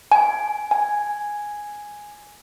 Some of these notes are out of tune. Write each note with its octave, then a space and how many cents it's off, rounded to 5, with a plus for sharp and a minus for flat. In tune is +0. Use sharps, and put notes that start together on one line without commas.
G#5 +15
G#5 +0